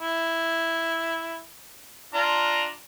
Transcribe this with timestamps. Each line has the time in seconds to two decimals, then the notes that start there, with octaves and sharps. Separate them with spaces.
0.01 E4
2.14 D4 F4 A#5